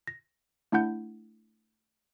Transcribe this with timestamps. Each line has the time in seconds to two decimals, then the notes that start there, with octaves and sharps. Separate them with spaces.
0.07 A#6
0.72 A3 D4 E4 F#5 G6